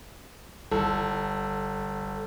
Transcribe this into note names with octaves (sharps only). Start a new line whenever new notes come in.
G1 A4